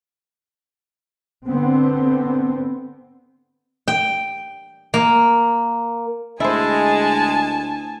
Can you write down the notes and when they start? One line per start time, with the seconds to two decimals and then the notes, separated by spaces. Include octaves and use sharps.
1.48 D3 B3 C4
3.88 G5
4.94 A#3
6.40 D2 G#3 E4 C5 G#5 A5